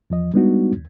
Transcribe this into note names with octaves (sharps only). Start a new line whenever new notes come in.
E2 F3 D#5
G3 G#3 B3 D4 D#4 F#4
D#2